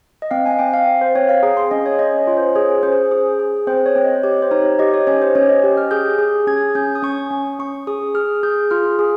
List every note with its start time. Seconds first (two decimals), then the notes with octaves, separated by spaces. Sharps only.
0.22 D#5
0.31 C4 F5
0.46 G#5
0.59 C4 G5
0.73 F5
0.87 C4
1.01 C5
1.15 C4 C#5
1.29 F5
1.43 G#4 A#5
1.57 C6
1.71 C#4 D#5
1.86 C#5
1.99 C#4 D#5
2.18 C#5
2.27 F4
2.37 C5
2.56 G#4 C#5
2.83 C#4 C5
3.11 G#4
3.39 G#4
3.67 C4 C5
3.86 C#5
3.96 C4
4.04 D#5
4.23 G4 C#5
4.42 C5
4.51 D#4 C#5
4.79 G4 D#5
4.94 C#5
5.07 C#4 C#5
5.22 C5
5.35 C#4 C#5
5.49 D#5
5.64 G4
5.77 F6
5.91 G#4 G6
6.19 G#4
6.47 C#4 G#6
6.75 C#4 G6
6.95 D#6
7.03 C#4 C#6
7.31 C#4
7.59 C#4 C#6
7.87 G#4 D#6
8.15 G#4 F6
8.43 G#4 G6
8.71 F4 F6
8.99 G#4